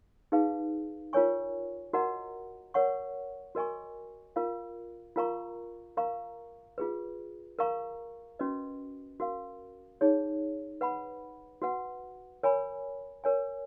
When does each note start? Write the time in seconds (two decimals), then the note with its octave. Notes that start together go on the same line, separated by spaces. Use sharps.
0.32 D#4 G#4 B4 F5
1.13 F4 A#4 C#5 G#5 C#6
1.93 F#4 A#4 D#5 F#5 A#5
2.74 A#4 C#5 F#5 C#6
3.55 F#4 A#4 D#5 G#5 C#6
4.36 F4 A#4 F5
5.16 F4 A#4 F5 A#5 C#6
5.97 A#4 F5 A#5 C#6
6.78 F4 G#4 B4
7.59 A#4 F5 A#5 C#6
8.39 C#4 F#4 B4 D#5
9.20 F#4 A#4 F5
10.01 D#4 G#4 C#5
10.81 B4 F#5 B5
11.62 F#4 B4 F#5
12.43 A#4 C#5 G#5 B5
13.24 A#4 C#5 G#5